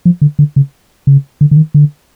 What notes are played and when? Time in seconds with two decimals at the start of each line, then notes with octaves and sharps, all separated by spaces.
0.05 F3
0.22 D3
0.39 D3
0.56 C#3
1.07 C#3
1.41 D3
1.51 D3
1.56 D#3
1.74 D3